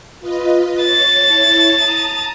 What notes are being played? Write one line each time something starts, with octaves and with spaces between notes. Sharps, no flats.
F4 B4 D#5
C#5 A6
E4 C#5 A5
A5 A#5 D#6